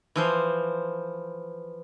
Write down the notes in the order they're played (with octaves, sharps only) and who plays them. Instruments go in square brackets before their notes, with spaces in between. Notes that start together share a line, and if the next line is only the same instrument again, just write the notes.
[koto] E3 F3 C5